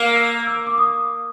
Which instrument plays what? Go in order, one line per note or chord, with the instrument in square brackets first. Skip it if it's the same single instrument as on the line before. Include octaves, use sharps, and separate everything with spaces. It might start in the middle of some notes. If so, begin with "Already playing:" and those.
Already playing: [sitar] A#3 [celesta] F6
[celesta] E6
E6
D6
D#6